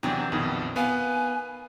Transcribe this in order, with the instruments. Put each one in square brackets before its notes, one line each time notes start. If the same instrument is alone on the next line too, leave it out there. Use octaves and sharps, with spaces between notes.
[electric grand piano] E2 C3 F#3 [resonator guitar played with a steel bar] E3 C4 D4
[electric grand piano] A#1 F2 B2 [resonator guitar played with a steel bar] D#3
[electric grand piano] B3 F5 [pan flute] G#5